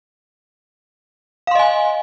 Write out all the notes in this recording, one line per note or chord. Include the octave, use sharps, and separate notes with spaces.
D#5 F5 G#5 C6